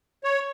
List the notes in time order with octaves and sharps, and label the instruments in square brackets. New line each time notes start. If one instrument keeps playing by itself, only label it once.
[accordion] C#5